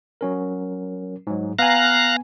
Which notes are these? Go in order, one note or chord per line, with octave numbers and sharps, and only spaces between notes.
F#3 C#4 A#4
G#2 F#3
B3 F5 G#5 A#5 F#6